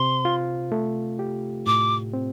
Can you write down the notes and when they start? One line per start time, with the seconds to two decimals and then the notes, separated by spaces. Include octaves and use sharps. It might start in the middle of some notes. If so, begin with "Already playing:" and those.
Already playing: C3 C5 C6
0.25 F4
0.72 A3
1.19 G4
1.66 A2 D6
2.13 C4